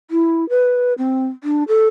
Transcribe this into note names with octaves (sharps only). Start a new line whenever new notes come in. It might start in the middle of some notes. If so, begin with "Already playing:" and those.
E4
B4
C4
D4
A4